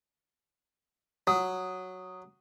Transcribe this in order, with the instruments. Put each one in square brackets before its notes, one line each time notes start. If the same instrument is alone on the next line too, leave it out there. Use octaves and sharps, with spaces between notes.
[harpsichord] F#3 [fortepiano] D#6